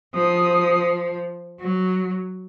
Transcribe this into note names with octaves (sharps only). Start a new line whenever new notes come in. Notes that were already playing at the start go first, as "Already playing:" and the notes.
F3 D#6
F#3